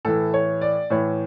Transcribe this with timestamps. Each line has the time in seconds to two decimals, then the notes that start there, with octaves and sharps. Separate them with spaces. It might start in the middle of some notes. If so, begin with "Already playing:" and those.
0.05 A2 E3 A4
0.34 C#5
0.61 D5
0.90 A2 E3 C#5